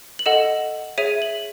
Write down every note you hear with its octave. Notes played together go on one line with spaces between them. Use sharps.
F#7
A4 D#5 F#5 E7
G#4 C#5 E5 D#7
F#7